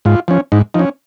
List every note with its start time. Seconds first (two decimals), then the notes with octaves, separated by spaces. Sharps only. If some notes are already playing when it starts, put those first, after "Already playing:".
0.05 G#2 F4
0.28 F3 C#4
0.52 G#2 D#4
0.74 F3 C#4 D#4